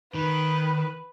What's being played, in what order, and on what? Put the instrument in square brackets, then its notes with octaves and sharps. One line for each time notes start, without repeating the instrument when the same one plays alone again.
[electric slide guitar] D#3 [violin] B4